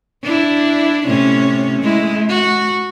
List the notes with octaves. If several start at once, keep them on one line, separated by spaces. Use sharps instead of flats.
D4 E4
A2 C3 C#4
G#3 E4
F#4